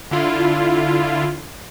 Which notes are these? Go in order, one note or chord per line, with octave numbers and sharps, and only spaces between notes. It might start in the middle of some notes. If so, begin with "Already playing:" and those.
D3 E4 F4